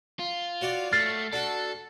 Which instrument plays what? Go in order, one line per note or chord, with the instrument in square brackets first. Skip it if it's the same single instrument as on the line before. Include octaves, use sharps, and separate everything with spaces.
[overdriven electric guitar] F4
[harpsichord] F#4 C#5 D5
[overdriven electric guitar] A3 [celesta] F6 A6 C7
[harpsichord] D4 F#4 [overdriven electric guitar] A4